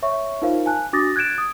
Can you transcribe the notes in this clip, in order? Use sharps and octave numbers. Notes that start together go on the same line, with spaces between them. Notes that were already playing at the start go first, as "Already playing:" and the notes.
C#5 E5 C#6
D#4 F4 A#4 C5 F5
G#5 A5 F#6
D4 F#4 D6 D#6 A6 A#6
F#6 G#6 A6 D7 E7
D#6